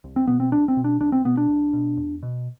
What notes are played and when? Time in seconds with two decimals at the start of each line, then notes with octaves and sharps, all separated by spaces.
0.04 C2
0.16 C4
0.27 B2 B3
0.40 C4
0.52 C2 D4
0.68 C4
0.77 B2
0.84 D4
1.00 C2 D4
1.12 C4
1.25 B2 B3
1.37 D4
1.49 C2
1.73 B2
1.97 E2
2.23 B2